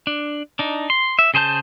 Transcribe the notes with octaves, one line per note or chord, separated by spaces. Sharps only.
D4
D4 D#4
C6
E5
C#3 G#4 C5 A5 G6